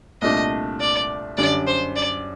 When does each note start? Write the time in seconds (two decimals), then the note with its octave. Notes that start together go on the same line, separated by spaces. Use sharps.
0.22 C2 A#2 A3 D4 D#5
0.80 D5
1.37 F#2 D3 G3 D4 D5
1.67 C5
1.96 D5